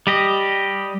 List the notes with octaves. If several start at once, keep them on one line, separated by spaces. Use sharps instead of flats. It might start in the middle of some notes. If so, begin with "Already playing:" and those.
G3 G4 D#5